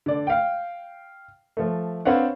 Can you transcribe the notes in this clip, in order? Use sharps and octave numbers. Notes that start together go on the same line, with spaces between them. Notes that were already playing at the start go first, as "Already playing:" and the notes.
D3 D5
F5 G5
F3 A3
C4 D4 B4 C#5 F5 F#5